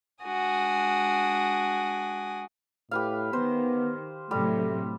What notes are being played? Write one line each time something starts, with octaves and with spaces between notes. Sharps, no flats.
G#3 D4 F#4 G#5 D#6
A2 G4 B4 F5
D#3 B3 C5
A2 C3 F#3 G3 A3